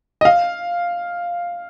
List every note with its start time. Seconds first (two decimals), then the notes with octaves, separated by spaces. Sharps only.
0.21 D#5
0.25 F5